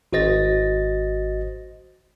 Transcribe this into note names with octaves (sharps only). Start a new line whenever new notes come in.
G#1 F#4 C5 D#5 A6 A#6